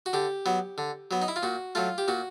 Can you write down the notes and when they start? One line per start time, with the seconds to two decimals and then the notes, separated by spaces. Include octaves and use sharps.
0.06 F#4
0.13 D3 G4
0.46 F#3 B3
0.78 D3
1.11 F#3 B3
1.22 D#4
1.28 E4
1.36 F4
1.43 A#2 F#4
1.75 F#3 A3 F4
1.98 G4
2.08 A#2 F#4